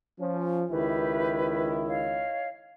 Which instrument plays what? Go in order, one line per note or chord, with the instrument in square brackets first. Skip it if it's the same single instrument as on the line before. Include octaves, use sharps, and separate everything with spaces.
[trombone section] F3 C#4
[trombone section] C#2 D#3 E4 [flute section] G4 B4 E5
[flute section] C#5 D#5 F5